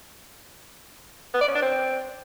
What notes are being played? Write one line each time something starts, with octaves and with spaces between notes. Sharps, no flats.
B3
D5
C#4
D4
C4